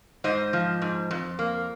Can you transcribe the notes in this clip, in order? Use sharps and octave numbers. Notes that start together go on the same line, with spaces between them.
G#2 C5 D#5
F3
G#2
F2
A#3